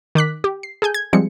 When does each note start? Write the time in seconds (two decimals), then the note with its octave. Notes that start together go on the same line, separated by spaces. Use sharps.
0.15 D#3 D6 F#6 B6
0.44 G4
0.63 C7
0.82 G#4 A4 G#5 G6
0.94 G#6
1.13 F3 G3 G#3 C4 C#7